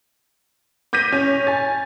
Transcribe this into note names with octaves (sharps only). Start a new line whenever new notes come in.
D6 G6 A#6 B6 D#7
C#4
G#5 A6